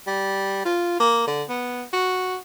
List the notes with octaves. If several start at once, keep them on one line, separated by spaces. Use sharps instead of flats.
G3
F4
A#3
D3
B3
F#4